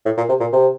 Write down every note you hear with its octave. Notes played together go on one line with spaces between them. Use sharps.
A2
A#2
C3
A#2
C3